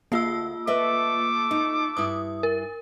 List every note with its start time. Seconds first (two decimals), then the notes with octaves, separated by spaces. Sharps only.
0.12 D2 A#3 F4 F5 E6
0.67 A3 A4 B4 D#5 E5 D6
1.51 D#4
1.97 G2 E4 D#6
2.43 A#4